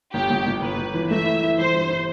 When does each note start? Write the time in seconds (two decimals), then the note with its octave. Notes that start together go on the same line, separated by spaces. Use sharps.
0.13 G1 G4
0.30 G1
0.46 G1
0.62 G1 B4
0.77 G1
0.94 E3
1.10 A3 E5
1.25 E4
1.43 E4
1.58 E3 C5
1.74 G2
1.90 E4